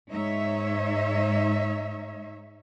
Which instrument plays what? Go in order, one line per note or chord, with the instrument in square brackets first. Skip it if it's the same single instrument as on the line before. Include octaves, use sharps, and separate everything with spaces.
[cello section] G#2 D#4 C#5 E5